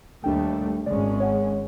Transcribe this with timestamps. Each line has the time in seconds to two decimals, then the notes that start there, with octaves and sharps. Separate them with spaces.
0.24 D#2 G3 A3 D4 G5
0.86 G#1 G#3 C#4 D5
1.20 C#5 F#5